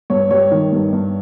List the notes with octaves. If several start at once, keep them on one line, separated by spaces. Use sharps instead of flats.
G2 C#5
G3 C#5
D#3
G2
G2